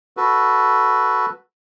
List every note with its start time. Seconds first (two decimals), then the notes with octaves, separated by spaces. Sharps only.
0.17 F#4 A4 B4